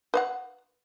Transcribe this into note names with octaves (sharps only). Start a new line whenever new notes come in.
B4 F5 F#5